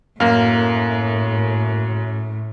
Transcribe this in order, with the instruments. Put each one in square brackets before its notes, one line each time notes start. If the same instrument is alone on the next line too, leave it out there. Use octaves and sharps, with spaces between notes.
[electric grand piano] F#2 [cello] A2 [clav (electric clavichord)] A#3 F5